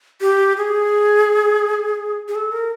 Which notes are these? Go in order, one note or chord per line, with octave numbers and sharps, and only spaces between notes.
G4
G#4
G#4
A4
A#4